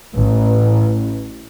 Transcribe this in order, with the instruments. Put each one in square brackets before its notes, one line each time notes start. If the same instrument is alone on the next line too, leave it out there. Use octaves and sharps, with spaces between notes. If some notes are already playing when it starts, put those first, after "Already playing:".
[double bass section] A1